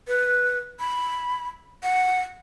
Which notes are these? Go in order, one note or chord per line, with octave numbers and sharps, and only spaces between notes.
B4
B5
F#5